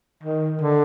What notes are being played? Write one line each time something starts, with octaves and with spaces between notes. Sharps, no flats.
D#3
D3